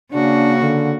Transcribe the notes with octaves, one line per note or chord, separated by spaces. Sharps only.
C#3 A#3 D4 F#4
D3